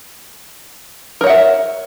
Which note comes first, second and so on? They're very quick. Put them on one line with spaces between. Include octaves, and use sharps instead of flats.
A#4 C#5 F#5 E5